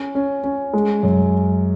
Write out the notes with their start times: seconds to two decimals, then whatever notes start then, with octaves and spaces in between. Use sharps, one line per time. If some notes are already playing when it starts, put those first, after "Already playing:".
Already playing: C#4
0.15 C#4
0.44 C#4
0.73 G#3
1.03 F#2